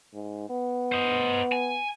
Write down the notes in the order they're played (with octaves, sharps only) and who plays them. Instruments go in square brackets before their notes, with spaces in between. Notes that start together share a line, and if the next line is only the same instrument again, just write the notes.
[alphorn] G#2
B3
[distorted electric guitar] C5 D#5
G#5